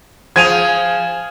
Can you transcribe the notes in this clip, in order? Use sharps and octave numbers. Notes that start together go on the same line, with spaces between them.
F3 G#4 G#6 D#7 F7